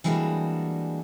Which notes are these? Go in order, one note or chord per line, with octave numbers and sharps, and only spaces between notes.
E3 G3 G#3 A#3 D4 F#4